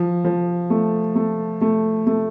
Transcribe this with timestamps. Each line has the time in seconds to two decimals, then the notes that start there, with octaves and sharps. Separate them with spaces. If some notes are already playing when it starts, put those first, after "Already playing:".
Already playing: F3
0.25 F3
0.70 A3
1.15 A3
1.61 A3
2.07 A3